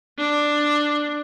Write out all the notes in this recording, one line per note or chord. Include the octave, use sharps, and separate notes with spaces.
D4